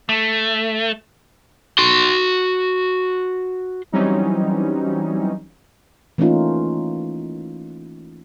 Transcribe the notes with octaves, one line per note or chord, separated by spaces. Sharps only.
A3
F#4 C6
E3 F#3 G3 C4 C#4 D#4
E3 A3 A#3 C#4 D#4 F4